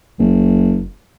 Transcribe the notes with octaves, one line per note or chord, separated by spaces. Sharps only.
F#1